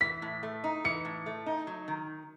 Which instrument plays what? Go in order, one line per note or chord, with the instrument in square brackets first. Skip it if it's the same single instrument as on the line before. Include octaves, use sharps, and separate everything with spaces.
[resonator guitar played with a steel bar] E3 [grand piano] B6
[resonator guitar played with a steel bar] A2
A3
D#4
[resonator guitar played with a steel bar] E3 [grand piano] C#7
[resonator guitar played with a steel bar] A2
A3
D#4
F#3
D#3